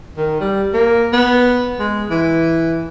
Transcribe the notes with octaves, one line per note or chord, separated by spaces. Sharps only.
D#3
G3
A#3
B3
G#3
E3